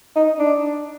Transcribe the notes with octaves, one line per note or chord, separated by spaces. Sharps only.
D#4
D4